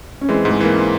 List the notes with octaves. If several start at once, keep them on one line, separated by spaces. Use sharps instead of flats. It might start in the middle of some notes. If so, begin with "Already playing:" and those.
C#4
E3 G#3 C4
G#2
G#3
E3 A#3
C4